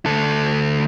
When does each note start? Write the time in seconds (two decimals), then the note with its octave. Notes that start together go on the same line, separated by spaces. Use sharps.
0.06 D2 A4